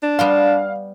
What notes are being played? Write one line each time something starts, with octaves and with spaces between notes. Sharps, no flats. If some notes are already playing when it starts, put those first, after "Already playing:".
D4
G3 B3 F5 C6